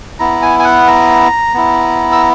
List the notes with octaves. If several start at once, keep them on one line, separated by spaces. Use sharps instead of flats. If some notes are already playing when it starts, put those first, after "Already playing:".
B3 E4 A#5
G#5
G#5
F#5
A#5
B3 E4
E6